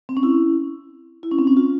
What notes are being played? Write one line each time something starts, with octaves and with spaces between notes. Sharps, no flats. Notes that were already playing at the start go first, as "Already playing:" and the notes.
C4
C#4
E4
E4
C#4
C4
C#4
F4